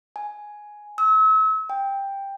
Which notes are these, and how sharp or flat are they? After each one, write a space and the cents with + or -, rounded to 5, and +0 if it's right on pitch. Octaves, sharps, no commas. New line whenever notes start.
G#5 +5
E6 -35
G5 +10